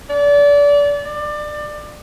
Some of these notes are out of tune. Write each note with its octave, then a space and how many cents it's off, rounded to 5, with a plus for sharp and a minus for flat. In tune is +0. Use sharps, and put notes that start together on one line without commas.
D5 -30
D5 +25